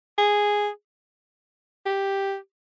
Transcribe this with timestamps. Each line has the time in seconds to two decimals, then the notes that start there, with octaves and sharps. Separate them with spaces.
0.18 G#4
1.86 G4